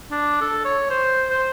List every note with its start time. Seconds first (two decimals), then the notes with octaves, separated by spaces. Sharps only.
0.11 D4
0.41 A4
0.65 C#5
0.90 C5
1.30 C5